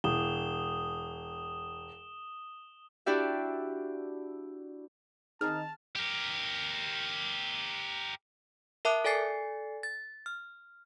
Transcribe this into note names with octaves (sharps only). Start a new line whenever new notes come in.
E1 D#6 E7 G7
D4 E4 F#4 G4 D5 E5
D#3 C4 D#4 G#4 A5 F6
G4 A#4
A#4 E5 A5 D6 D#6 F#6
A4 D5 G#5 A6 C7 C#7
A6
F6